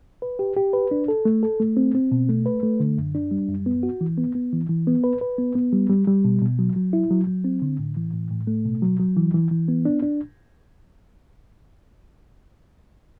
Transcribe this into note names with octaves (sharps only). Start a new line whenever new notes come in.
B4
G4
G4
B4
D4
A4
A3
A4
A3
C4
C4
B2
A3
B4
A3
D3
F#2
D4
G3
F#2
B3
F#4
E3
B3
B3
E3
E3
B3
B4
B4
B3
B3
G3
G3
G3
B2
B2
F#3
F#3
E4
F#3
F#3
C4
D3
A2
E3
A2
A2
A3
B2
F#3
F#3
E3
E3
E3
B3
D4
D4